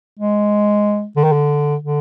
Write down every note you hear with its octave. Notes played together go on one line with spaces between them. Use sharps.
G#3
D3
D#3
D3
D3